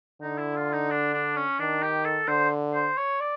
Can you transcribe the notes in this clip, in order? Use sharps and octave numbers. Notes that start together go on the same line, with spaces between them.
D3 D#4
E4
F4
D#4
D4
D4
C#4
D#3 D4
G4
A4
D3 C5
C5
C#5
D5